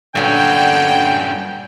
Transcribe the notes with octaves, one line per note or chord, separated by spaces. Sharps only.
G2 A#2 D3 F#3 B3 C#4 G5